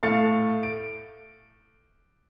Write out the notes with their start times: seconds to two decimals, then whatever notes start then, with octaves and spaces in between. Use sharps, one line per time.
0.03 A2 A3 F5 A6 C#7
0.63 D7